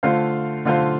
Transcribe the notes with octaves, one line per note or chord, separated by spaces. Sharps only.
D3 A3 F4 C5 F5
D3 A3 F4 C5 F5